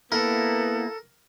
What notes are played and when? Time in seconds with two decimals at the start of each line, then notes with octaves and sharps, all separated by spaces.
0.12 A#3 B3 E4 A4 A#4